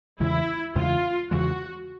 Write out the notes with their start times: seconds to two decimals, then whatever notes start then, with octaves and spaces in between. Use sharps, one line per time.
0.20 E2 C#3 E3 G#3 E4
0.75 E2 C#3 E3 G#3 F4
1.30 E2 C#3 E3 G#3 F#4